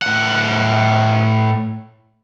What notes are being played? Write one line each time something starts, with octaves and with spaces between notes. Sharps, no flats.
A2 F#5